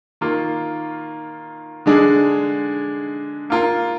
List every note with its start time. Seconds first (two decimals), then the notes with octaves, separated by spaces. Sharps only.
0.21 D#3 A#3 F4
1.86 D3 G#3 D4 G#4
3.50 A#3 F4 A#4